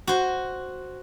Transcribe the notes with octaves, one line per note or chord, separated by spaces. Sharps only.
F#4 C5